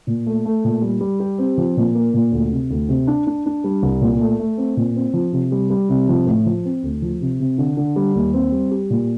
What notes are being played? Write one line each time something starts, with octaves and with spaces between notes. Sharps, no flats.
A#2
A3
A3
A#2
G3
G3
G4
C4
F3
A#2
A#3
A#2
D2
C3
D2
C3
D4
D4
D4
G3
C2
A#2
A3
A3
C4
A#2
C4
F3
C3
G3
G3
C3
F3
A2
F3
C4
D2
F3
C3
C3
D3
D3
G3
D#2
C4
G3
G4
A#2